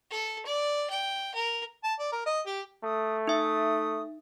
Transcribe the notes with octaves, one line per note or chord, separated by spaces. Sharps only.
A4
D5
G5
A#4
A5
D5
A#4
D#5
G4
A3 D#6
D#4 E5 D#6